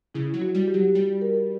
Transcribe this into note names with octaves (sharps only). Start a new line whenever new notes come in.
C#3 E4
F#3
F#4
G3
G4
F#3
G3
A#4